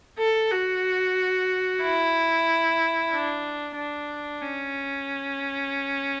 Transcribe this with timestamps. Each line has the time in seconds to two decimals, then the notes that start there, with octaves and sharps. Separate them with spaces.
0.18 A4
0.51 F#4
1.82 E4
3.11 D4
3.76 D4
4.41 C#4